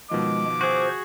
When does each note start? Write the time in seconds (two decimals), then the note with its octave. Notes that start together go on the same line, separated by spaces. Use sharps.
0.11 B2 D#3 F3 G#3 D6
0.61 F#4 G#4 C5